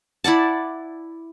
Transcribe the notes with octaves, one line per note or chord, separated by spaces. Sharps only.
E4 D5 F#5 A5